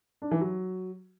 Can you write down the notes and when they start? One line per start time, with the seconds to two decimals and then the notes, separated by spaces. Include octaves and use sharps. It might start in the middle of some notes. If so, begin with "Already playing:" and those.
0.22 D4
0.31 E3
0.41 F#3